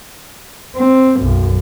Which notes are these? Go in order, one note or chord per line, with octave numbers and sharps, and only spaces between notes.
C4
B1 F#2